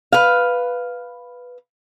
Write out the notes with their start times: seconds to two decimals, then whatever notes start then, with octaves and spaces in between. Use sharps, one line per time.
0.12 B4 F5